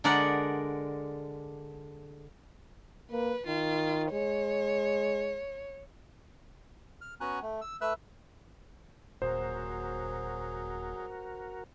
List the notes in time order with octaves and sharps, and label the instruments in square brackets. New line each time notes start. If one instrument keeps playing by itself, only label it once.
[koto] D3 G#3 A#4 D5 F#5
[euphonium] A#3 [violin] B4
[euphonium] D#3 [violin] F4
[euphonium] G#3 [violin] C#5
[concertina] F6
B3 C#4 F#4 G#5 A#5 F#6
A3
E6
A3 B4 E5 E6 F#6
[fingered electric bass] D#1 A#2 [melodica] F#3 G#4 [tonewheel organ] F#4 A#4 [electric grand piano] C5